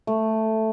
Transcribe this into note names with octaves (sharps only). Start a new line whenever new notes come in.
A3